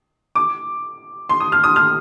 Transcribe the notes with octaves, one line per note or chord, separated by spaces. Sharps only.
D6
C6
D#6
F6
D#6
F6